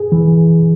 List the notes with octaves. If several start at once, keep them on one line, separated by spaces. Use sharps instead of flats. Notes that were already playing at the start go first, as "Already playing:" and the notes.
Already playing: G#4
E3